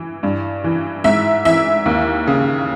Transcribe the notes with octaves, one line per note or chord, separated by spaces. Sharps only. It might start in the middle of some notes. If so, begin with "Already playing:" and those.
Already playing: E3
G2
E3
G#2 E5
E3 E5
D#2
C#3